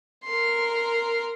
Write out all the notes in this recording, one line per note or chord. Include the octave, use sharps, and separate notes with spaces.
A#4 C6